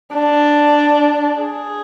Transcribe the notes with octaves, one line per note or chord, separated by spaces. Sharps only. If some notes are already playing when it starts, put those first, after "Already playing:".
D4
G#4